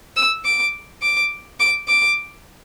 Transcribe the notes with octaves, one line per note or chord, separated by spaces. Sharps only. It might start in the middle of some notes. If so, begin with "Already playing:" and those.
E6
D6
D6
D6
D6